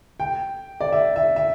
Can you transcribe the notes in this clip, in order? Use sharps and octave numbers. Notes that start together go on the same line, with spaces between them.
G5
D5
E5
E5
E5